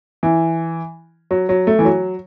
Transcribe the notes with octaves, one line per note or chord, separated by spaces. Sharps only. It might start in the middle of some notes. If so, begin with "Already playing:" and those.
E3
F#3
F#3
A3
E3
F#3